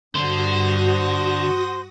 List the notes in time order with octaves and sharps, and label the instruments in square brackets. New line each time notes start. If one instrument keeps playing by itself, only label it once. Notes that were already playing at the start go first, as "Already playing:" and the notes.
[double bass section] G2 [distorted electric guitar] D3 D4 [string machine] F#4 D#6 A#6 [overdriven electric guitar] C5